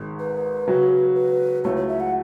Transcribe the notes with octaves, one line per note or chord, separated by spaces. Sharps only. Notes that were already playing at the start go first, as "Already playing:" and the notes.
Already playing: G#1 G#2 G#3
B4
C#3 F#3 C#4 F#4
B4
C#2 C#3 F#3 A3 E4 C#5
C#5
E5
F#5